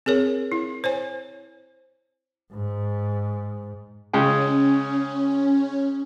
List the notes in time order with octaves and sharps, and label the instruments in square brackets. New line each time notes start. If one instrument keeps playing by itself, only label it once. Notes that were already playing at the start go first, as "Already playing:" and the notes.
[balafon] C4 G#4 A#4 C#5
E4
C5 C#5 G#5
[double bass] G#2
[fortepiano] C#3 G#3 G5 [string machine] C#4